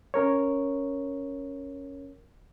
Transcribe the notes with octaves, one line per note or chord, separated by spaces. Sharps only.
C#4 A#4 C#5